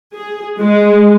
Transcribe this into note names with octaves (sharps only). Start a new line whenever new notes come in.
G#4
G#3